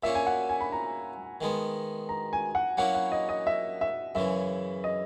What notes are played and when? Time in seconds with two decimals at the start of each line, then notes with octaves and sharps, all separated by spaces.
0.03 A#2 A#3 C#4 E5
0.15 G#5
0.26 F#5
0.49 G#5
0.61 B5
0.72 A#5
1.41 D#3 G#3 B3
2.09 A#5
2.33 G#5
2.55 F#5
2.77 F#3 A#3 C#4 E4 F#5
2.95 F#5
3.12 D#5
3.29 D#5
3.47 E5
3.81 E5
4.15 F#2 C#3 E3 E5
4.84 D#5